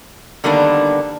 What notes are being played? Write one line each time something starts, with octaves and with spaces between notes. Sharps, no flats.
D3 D#3 G3 A#3 B3 D4